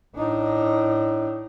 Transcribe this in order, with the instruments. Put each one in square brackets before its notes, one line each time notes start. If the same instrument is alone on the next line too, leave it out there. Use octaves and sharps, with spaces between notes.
[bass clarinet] A2 [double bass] D4 D#4